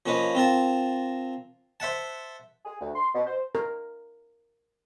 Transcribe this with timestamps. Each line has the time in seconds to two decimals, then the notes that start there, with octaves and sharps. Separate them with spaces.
0.06 F3 A#3 C#4 B4 D#5
0.35 C4 F4 A#4 A5
1.80 C5 E5 F#5 A5
2.65 G#4
2.80 D2
2.95 C6
3.15 B2
3.27 C5
3.55 A#4